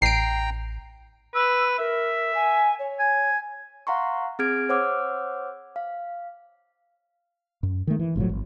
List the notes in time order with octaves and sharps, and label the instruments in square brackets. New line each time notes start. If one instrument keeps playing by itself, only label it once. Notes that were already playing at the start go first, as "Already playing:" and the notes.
[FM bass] A1 [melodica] G5 A#5 [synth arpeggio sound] C7 D7
[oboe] B4 [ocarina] E6
[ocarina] A#4 [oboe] E5
[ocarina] G#5
C#5
[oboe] G#5
[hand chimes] F5 F#5 A#5 C6 C#6
C4 G#4 F6 G#6 D7
C5 C#5 F#5 D6 E6 F6
F5
[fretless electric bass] F#2
D#3 A3
E3
F#1 A2 F3 F#3
G#1